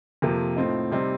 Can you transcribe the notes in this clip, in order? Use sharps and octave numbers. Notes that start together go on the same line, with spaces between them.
F2 C3 F3 A#3
A2 F3 C4 D#4
C3 G3 C4 D#4